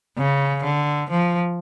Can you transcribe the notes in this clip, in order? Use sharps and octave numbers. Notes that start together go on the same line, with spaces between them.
C#3
D3
F3